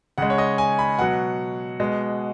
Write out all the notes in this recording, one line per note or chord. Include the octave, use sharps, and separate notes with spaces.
C#3 G#3 F#5
C#5
D#5
G#5
B5
B2 F#3 F#5
B2 G#3